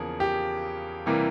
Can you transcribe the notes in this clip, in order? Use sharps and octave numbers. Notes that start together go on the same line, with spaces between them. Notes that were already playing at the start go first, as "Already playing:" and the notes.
Already playing: E2 C#3 F3 A#3 G#4
G4
C3 E3 G3 A#3